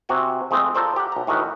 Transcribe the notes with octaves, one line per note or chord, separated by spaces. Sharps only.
C3 C4 F#4 G#5
F2 G#3 A3 C4
F4 A4 A#4 C5 D5
G4 F#5
B1 A#5
A2 D#3 E3 F#4 B4